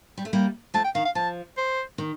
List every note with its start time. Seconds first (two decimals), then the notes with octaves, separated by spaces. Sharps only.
0.18 G3
0.25 A3
0.33 G3 A#3
0.74 F3 A3 A5
0.84 G5
0.95 D#3 F5
1.05 F5
1.15 F3 A5
1.58 C5
1.98 D#3